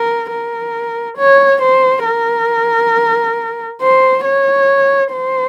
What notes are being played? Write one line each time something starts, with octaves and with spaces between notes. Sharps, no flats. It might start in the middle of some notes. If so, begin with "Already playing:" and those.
Already playing: A#4
A#4
C#5
C5
A#4
C5
C#5
C5